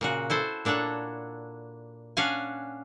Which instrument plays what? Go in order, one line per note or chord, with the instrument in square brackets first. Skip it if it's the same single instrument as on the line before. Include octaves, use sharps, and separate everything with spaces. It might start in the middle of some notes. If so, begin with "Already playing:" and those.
[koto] A#2 C#3 F#4
E4 A4 C5
A#2 D4 A4 C#5 F#5
C#4 D4 F5 F#5 G#5